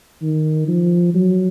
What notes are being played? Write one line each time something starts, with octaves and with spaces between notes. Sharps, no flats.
D#3
F3
F#3